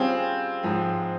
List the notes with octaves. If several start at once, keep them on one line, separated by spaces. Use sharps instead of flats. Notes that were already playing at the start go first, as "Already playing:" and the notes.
Already playing: G3 C4 C#4 F4 G#4
G#2 F3 G#3